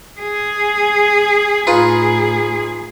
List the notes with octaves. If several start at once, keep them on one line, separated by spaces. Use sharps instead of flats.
G#4
A2 D#4 F4 G#4 B4